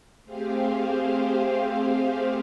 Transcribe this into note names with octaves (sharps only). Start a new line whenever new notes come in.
A3 C4 G4 G#4 C5 F5